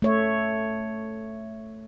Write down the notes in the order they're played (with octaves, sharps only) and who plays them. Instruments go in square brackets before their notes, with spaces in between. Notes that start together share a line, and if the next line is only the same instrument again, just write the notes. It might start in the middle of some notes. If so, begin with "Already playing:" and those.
[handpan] A3 C#5 E5